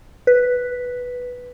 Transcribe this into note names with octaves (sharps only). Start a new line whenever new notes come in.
B4